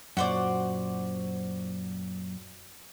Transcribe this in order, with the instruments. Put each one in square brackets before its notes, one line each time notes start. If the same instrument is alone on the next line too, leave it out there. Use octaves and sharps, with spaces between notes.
[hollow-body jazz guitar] F#2 A#2 [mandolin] F#4 C5 D5